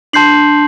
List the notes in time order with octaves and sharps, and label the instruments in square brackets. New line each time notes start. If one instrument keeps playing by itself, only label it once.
[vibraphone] D4 [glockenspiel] A5 C6 G6 C7 F#7